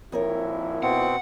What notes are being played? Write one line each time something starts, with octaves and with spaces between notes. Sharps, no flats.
G#1 F2 A#2 E4 A#4 C#5
B2 C4 F#5